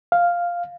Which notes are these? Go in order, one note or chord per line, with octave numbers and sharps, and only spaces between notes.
F5